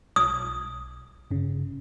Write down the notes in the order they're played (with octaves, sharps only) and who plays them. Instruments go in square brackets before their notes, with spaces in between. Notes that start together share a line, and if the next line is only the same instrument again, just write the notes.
[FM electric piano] B1 [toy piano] D#6
[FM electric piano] G1 C#3